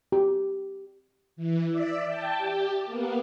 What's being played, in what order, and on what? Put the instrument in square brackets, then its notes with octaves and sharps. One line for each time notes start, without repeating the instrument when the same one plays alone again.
[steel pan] G4
[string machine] E3
D5 E5
G5 A5
G4
A#3 B3